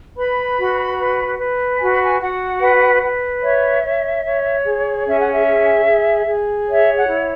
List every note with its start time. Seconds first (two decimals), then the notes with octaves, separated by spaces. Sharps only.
0.17 B4 B5
0.58 F#4
0.98 B4
1.39 B4
1.79 F#4 G#5
1.92 B5
2.04 G#5
2.20 F#4 F#5
2.62 B4
3.02 B4
3.42 C#5 E5
3.83 C#5
4.23 C#5
4.65 G#4
5.05 C#4 E5
5.19 F#5
5.31 E5
5.47 G#4
5.86 G#4
6.27 G#4
6.68 C#5 E5
6.96 F#5
7.08 E4